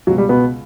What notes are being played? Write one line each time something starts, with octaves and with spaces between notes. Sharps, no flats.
C#2 B2 F#3
G3
B2 B3